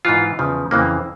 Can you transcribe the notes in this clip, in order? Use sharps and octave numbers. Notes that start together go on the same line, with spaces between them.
G#2 E3 F4
E2 C#3 F3
F2 C#3 E3 A#3